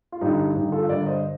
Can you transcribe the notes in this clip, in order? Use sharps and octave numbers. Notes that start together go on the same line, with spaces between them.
F4
G2 D3 D#4 G4
G2 D3 D#4 G4
F4 A4
G2 D3 A#4 D5
C5 D#5